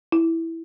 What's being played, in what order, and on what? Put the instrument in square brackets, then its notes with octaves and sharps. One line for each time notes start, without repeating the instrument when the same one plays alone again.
[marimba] E4